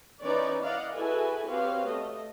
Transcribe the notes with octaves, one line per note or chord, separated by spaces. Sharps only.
E3 C#4 D#4 B4 C#5 D5
E4 D5 D#5 F5 F#5
E4 F#4 G#4 A4 B4 G#5
C4 F#4 G4 B4 C#5 F5
A3 D#5